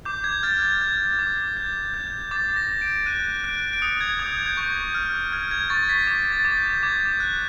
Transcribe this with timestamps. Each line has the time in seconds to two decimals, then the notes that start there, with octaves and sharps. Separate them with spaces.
0.05 D6 G6
0.24 G#6
0.43 F6 A6
0.62 G#6
0.81 F6 G#6
1.19 D6
1.57 G6
1.94 G6
2.31 D6 A6
2.56 A#6
2.69 G6
2.82 D7
3.06 F#6 D#7
3.44 F#6 D7
3.73 D7
3.82 D#6 C#7
4.01 G#6
4.19 D#6 G6
4.39 G#6
4.46 G6
4.57 C#6 G6
4.95 F6
5.32 F6 G#6
5.51 G#6
5.70 C#6 A6
5.89 B6
6.07 D6
6.32 A6
6.45 D6
6.57 G6
6.83 D6 G#6
7.20 F#6